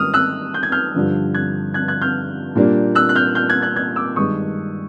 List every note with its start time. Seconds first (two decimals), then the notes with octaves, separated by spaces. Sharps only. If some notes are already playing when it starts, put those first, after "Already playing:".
Already playing: G#2 D#3 G3 A#3 C#4 D#6 F6
0.14 E6 F#6
0.54 G6
0.63 G#6
0.72 F6 G6
0.94 G2 D3 F3
1.35 F#6 G#6
1.74 F#6 G#6
1.88 F#6 G#6
2.02 F6 G6
2.55 A#2 G3 A#3 D4
2.95 E6 F#6
3.09 F#6
3.15 F6 G6
3.35 F6 G6
3.49 F#6 G#6
3.62 F#6 G#6
3.76 F#6 G#6
3.96 D6 E6
4.16 G2 D#3 G#3 C#6 D#6